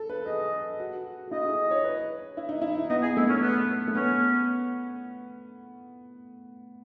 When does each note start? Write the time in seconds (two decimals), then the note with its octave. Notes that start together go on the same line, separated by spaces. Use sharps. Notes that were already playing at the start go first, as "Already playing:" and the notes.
Already playing: A4
0.10 B4
0.26 G#4 D#5
0.80 F#4
1.28 F#4
1.31 E4 D#5
1.46 G#4
1.71 C#5
1.84 B4
2.37 E4
2.49 D#4
2.62 E4
2.90 B3 D#5
3.03 G#4
3.17 A3 E4
3.29 C#4
3.42 B3
3.88 A3
3.95 B3 C#4